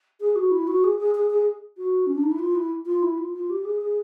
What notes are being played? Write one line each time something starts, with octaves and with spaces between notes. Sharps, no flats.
G#4
F#4
E4
F#4
G#4
G#4
G#4
G#4
F#4
C#4
D4
D#4
E4
F4
E4
F4
E4
F4
F4
G4
G#4
G#4